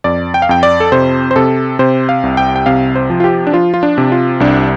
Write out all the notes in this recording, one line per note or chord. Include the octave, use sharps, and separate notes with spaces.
F2 D5
G5
F5
F2 G5
D5
A4
C3 C5
C5
C3 A4
C3 C5
F5
C2
G5
G5
C3 F5
C5
F3
F4
G4
D4
F3 F4
F4
D4
C3
F4
C2 D4